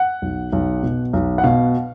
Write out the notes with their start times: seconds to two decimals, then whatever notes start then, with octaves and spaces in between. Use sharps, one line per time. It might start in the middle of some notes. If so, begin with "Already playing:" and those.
Already playing: F#5
0.22 B1
0.53 B1
0.83 B2
1.13 B1
1.38 F#5
1.44 B2 F5